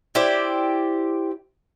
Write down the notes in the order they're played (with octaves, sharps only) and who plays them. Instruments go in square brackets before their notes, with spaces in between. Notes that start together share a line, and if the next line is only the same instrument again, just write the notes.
[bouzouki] E4 G4 C5 D5